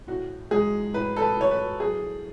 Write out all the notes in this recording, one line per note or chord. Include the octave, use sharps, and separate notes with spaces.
A2 F#4
G#3 G#4
A2 B4
A4
B4
A2 C#5
B4
F#3 G#4